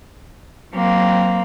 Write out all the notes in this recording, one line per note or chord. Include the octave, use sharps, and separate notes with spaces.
F#3 A#3 C4